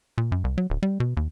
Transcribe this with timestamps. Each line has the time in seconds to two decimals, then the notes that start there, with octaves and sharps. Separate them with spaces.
0.18 A#2
0.32 F#2
0.44 C2
0.58 F#3
0.70 D1
0.83 G3
1.00 B2
1.17 D#2